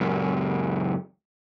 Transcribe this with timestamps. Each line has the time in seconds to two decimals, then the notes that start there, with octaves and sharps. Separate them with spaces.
0.01 C#2 F#2